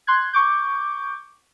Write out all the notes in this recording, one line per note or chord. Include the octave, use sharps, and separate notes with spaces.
C6 F#6 G#6
C#6 D6 G6